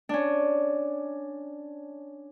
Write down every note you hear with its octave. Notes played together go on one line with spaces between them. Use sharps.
C#4 D4